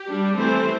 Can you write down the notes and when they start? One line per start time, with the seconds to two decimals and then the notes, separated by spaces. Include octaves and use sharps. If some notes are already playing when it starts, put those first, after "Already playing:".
Already playing: G4
0.08 G3 D4
0.37 E3 A3 C4 C5